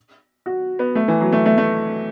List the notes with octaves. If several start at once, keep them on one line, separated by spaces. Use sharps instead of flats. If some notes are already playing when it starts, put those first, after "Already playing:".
F#4
B3
A3
E3
F#3
A3
A3
A3